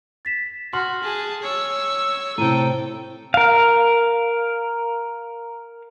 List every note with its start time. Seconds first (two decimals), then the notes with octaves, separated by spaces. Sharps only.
0.25 A6 B6 E7
0.73 F#4 C6 F6 F#7
1.03 G#4 A5
1.43 C#5 E6
2.38 A2 C3 A4 G5 A#5 D#7
3.34 A#4 F5